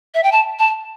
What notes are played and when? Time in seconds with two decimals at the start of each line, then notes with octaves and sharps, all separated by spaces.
0.15 E5
0.23 G5
0.32 A5
0.59 A5